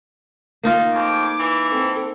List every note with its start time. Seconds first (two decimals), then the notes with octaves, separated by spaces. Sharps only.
0.63 A#3 D#4 F4
0.95 F2 D6
1.40 E3
1.71 C4 A4